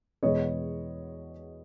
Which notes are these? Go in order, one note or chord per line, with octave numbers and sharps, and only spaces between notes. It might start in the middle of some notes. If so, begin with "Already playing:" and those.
E2 B2 G#3 B3 C#5 D#5